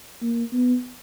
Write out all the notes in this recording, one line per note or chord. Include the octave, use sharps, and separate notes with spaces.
A#3
B3